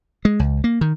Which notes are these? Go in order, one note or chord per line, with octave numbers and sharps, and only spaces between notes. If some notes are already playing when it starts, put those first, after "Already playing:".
G#3
C#2
A#3
D#3